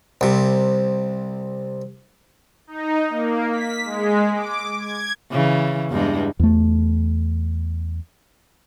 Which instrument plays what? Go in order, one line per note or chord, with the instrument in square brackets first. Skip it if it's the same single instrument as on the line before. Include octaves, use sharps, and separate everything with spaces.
[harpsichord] C2 C3
[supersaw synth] D#4
A#3
B6
G#3
D6
G#6
[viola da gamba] C#3 E3
E2 G2 G#3
[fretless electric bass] E2 A3